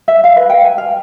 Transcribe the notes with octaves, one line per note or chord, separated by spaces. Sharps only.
E5
F5
B4
G5
G#5
F5